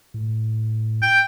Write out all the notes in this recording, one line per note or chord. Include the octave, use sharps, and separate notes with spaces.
A2
G5